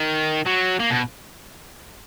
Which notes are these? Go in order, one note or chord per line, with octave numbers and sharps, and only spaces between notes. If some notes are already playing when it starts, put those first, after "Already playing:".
Already playing: D#3
F#3
A#3
B2